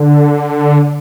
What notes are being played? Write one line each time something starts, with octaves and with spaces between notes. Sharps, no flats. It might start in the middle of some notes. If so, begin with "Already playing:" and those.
Already playing: D3